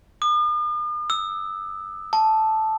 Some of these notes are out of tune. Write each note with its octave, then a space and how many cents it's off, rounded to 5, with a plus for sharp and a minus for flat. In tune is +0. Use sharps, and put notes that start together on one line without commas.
D#6 -45
E6 -15
A5 -5